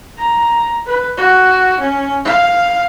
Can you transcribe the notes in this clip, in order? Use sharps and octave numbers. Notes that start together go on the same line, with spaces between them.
A#5
B4
F#4
C#4
F5